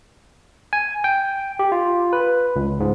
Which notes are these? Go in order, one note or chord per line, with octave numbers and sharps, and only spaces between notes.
G#5
G5
G4
F4
B4
C#2
G#2